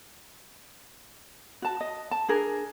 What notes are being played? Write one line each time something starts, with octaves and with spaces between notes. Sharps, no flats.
F#4 A5
D#5
A5
D4 G#4 A#4